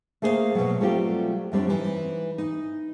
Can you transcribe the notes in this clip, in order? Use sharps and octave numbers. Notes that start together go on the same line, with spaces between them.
A3 A#3 G#4 C5 C#5 F5
B2 F#3
F#3 G3 A3 C4 F4 G4
F#2 G3 C4 D4
E3 D#4
D#4